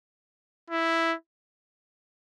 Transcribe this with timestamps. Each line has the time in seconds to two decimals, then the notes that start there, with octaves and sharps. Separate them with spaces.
0.70 E4